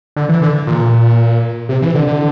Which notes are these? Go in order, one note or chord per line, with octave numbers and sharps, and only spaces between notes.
D3
E3
D3
A#2
C3
E3
D3
D3